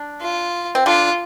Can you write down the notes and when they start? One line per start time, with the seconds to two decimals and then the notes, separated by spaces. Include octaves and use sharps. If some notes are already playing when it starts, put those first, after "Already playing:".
Already playing: D4
0.22 F4
0.75 C4
0.86 D3 D4 F4